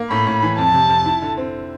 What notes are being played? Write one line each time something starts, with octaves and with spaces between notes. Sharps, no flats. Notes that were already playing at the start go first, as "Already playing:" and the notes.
Already playing: A#3
A2 B5
A2
E3
F2 A5
C3
F2
E4
D3
C4